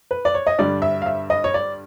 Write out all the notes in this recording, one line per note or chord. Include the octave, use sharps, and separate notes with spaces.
B4
D5
C#5
D#5
G2 D3 G3 D5
E5
F5
E5
D#5
C#5
D5